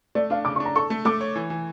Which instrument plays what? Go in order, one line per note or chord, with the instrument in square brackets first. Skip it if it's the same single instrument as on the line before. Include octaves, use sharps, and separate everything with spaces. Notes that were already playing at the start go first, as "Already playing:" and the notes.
[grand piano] A3 [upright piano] D5
[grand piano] D4 [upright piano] F5
[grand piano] C#3 [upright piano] D6
[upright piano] C#6
[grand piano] D4
[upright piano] A#5
[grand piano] A4 [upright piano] C#6
[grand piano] A3
[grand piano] A3 [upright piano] D6
[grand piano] C#5
E3
E3